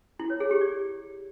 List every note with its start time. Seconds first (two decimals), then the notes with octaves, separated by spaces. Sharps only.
0.19 E4
0.30 C#5
0.40 G#4
0.51 G4
0.61 D5